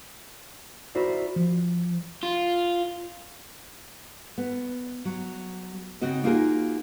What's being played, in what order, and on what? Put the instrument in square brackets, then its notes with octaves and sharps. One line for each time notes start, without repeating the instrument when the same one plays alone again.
[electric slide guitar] E4 F#4 A#4 C5 D5
F3
[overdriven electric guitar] F4
[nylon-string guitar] B3
F#3
C#3 C4 D#4 F#4 D#5
A#3 D#4 F4 F#4 G#4 A#4